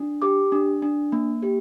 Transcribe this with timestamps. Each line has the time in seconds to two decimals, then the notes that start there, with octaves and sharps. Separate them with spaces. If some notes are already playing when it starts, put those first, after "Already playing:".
Already playing: D4
0.22 G4 D6
0.52 D4
0.82 D4
1.12 A#3
1.42 G4